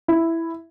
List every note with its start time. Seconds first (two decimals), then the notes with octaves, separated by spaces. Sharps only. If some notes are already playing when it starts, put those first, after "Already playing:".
0.08 E4